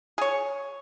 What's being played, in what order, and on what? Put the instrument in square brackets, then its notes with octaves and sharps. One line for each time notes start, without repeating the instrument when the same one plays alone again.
[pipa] G#4 C#5